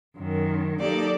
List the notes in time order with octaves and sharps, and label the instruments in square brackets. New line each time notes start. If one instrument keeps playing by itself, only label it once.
[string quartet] F#2 D#3
F#3 A#3 D#4 G4 A4 D5